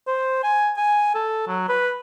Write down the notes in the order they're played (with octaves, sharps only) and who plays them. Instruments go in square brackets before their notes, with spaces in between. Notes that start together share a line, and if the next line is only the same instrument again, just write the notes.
[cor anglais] C5
G#5
G#5
A4
F#3
B4